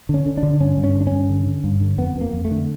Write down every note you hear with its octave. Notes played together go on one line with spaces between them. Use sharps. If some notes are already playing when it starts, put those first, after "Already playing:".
D3 C#4
D3
D4
D3
G2 C#4
G2
C#4
D3
D4
G2 C#4
D3
D3
G2
D3
F2 B3
F2
A#3
F2
A3
D3